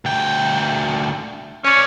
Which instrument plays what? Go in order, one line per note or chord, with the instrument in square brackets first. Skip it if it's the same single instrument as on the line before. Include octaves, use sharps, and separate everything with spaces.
[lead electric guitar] D2 G5
[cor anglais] C#4 [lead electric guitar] C#5 D5